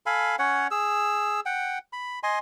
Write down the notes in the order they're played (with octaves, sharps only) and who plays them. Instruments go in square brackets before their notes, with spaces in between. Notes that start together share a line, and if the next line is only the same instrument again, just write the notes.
[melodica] A4 F5 G#5 B5
C#4 C#5 F#5
G#4 E6
F#5 G5
B5
D#5 G#5 C6